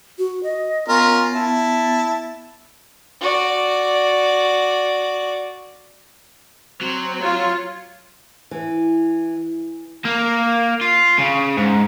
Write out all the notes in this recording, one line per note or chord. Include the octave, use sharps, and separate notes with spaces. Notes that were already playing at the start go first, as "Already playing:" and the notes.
F#4
D#5
B3 C#4 F4 A#4
E4 A5
F#4 D5
F#3 C4
F4 C#5
E3
A#3
F4
C#3
G#2